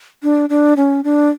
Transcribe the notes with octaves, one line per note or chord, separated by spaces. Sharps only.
D4
D4
C#4
D4